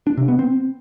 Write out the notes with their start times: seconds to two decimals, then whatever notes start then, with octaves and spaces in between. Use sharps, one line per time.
0.07 D4
0.17 C3
0.28 B3
0.39 C4